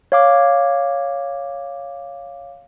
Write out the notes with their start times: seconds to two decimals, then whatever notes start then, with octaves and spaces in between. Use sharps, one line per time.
0.12 C#5 F5 D6